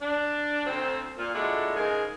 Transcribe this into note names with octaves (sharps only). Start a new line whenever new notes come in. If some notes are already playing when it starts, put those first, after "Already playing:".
D4
D2 C4 C5
A#2 F4
A#2 G#3 D4 E4 F#4 A4
G#2 C#3 G#3 G#4 A#4